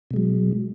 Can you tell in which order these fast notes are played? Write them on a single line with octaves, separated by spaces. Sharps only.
B2 G#3 F#3